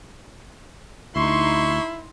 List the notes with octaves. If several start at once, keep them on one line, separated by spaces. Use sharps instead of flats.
D2 D#4 E4 C6 C#6